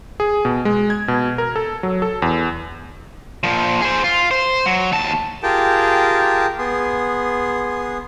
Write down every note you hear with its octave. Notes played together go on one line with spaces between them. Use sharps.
G#4
B2
G#3
G#6
B2
A#4
A4
F#3
A4
E2
A#2 F3
G#4 C5
F4
C5
F#3
D#2 A5
F4 G4 G#4 A#4 G5 A5
B3 G#4 C6